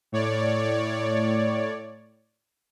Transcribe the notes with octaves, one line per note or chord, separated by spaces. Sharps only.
A2 C#5 D5